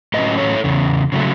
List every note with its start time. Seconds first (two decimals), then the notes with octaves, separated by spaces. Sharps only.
0.14 A2 F#3 C#4 B4 D#5
0.38 A4 C#5
0.64 E2 C#3
1.12 C#3 F#3 A3